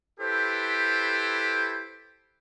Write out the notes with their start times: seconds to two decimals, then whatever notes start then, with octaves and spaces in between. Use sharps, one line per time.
0.20 E4 G4 A4 B4 C5